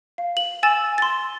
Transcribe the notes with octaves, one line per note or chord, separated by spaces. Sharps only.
F5
F#7
G#5 E6 A6 E7
C6 A6